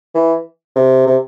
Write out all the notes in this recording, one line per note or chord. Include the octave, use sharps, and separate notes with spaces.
E3
C3
C3